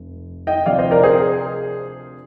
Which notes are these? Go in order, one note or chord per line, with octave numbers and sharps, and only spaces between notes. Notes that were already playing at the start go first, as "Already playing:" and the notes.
Already playing: F1
D#5 G5
D2 C3 F3 D5 F5
C5 D#5
A#4 D5
G#4 C5